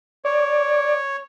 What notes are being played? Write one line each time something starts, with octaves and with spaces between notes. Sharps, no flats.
C#5 D5